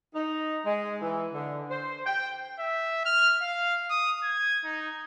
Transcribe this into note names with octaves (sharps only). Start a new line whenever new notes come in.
D#4
G#3
E3
D3
C5
G5
E5
F6
F5
D#6
G#6
D#4